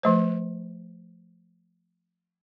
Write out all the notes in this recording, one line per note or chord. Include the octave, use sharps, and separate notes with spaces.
F3 A3 C5